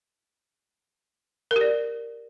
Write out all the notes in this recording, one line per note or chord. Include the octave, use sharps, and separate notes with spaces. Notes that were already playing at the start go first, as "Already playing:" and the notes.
A#4
G4
D5